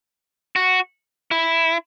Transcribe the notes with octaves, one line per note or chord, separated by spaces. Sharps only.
F#4
E4